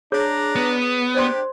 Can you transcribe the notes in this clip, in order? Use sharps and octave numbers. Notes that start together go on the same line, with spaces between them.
D4 G#4 C#5 A#5 D6
B3
D4 G4 C5 D5 C6